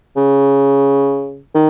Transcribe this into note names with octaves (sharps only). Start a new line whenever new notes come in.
C#3
D#3